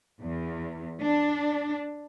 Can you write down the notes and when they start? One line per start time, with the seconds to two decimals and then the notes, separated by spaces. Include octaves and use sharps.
0.20 E2
1.00 D4